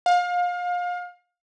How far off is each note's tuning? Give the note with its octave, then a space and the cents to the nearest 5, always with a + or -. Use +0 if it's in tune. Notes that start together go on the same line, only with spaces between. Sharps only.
F5 +30